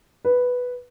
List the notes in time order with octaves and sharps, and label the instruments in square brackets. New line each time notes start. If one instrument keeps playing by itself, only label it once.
[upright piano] B4